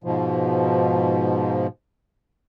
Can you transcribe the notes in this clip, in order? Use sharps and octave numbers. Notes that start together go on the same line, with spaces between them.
G#2 B2 F3